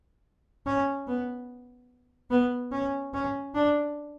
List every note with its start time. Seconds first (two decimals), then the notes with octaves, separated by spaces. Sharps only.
0.66 C#4
1.07 B3
2.30 B3
2.72 C#4
3.14 C#4
3.55 D4